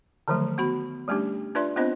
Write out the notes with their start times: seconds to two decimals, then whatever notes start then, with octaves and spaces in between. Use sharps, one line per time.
0.28 D3 D#3 F3 F#3 A3
0.58 B3 F#4 B5
1.08 G3 A3 C#4 D4 G4
1.55 D4 F4 B4 D5 E5 C6
1.76 B3 C4 D4 F4 C5 D#5